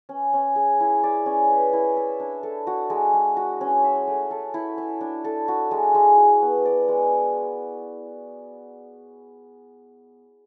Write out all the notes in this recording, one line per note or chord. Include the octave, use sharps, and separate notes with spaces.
C#4
C#4
G#4
E4
D5
C#4
B4
E4
E5
D4
A4
F#4
G#3
G#3
F#4
C#4
E5
A3
A4
E4
E5
D4
A4
F#4
G#3
G#3
F#4
B3
D5
G#3